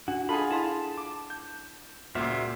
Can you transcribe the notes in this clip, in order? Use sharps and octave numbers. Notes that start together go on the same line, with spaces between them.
D4 F#4
D#4 F4 G#4 A4 F#5 A5 B5
E4 F5 A5 C6
D6
G6
C#2 A#2 F#4 C5 E5 F6